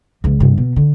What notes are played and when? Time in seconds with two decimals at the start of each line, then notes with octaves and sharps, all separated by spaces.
0.24 C#2 E3
0.40 G2 C3
0.58 B2
0.76 D3